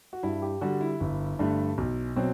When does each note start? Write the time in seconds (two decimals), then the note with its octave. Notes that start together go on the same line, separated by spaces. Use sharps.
0.13 F#4
0.23 G2 E4
0.42 G4
0.61 D3 G3 F#4
0.81 E4
1.00 G1
1.39 G2 D3 A3
1.78 B1
2.16 B2 F#3 C4